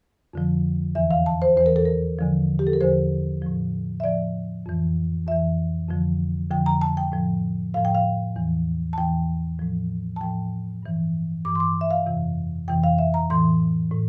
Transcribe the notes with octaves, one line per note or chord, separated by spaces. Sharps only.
F2 D3 F3
E2 E3 E5
F5
A5
C5
E2 E3 C5
A#4
A4
A#4
E2 D3 F3
G4
A4
A#4
E2 D3 F3 C5
A2 F3
E5
A2 F3 D5
F2 E3
F2 E3 E5
F2 D3 F3
F2 D3 F3 G5
A#5
A5
G5
A2 F3
A2 F3 F5
G5
F5
E2 E3
A5
E2 E3 G5
A2 F3
A5
A2 F3 G5
G2 E3
G2 E3 D6
C6
D6
E5
F5
F2 C3 E3
F2 C3 E3 G5
F5
E5
A#5
A2 E3 C6
A2